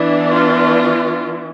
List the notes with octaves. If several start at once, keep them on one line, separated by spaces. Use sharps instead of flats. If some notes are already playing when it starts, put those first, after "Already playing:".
Already playing: E3 B3 D4
F4